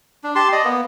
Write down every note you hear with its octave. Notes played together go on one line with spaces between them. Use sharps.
D4
G4 A5 C6
D5 D#5
A#3 B3